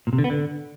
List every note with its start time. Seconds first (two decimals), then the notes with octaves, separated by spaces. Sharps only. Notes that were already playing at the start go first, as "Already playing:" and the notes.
0.07 A#2
0.13 C3
0.18 D3
0.24 B3
0.30 D3